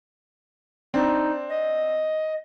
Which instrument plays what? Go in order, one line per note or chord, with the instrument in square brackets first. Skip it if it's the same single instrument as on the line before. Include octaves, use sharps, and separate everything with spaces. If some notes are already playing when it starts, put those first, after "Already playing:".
[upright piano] C4 D4 [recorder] D#4
[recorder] D#5